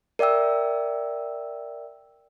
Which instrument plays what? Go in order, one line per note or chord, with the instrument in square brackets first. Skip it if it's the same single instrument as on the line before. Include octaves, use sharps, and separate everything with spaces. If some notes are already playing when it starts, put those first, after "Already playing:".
[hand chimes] A#4 D5 E5 G5 E6